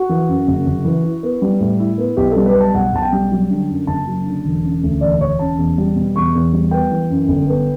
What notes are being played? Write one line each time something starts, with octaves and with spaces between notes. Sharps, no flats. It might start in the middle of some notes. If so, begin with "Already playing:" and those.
Already playing: F#4
E3
F#2
F#1
F#1
E3
E4
B3
G3
A2
E4
B3
B1 G4
G3 A4
B4
B2
A5
B1 F#5
B1 A5
G5
G3
F#3
D3
F#2
F#1 A5
F#3
D3
E1
C#3
D2
E1 D5
E1 C#5
C#3 A5
E2
G3
B2
E2 C#6
E2
G3
B3 G5
E3
F#2
G1
B3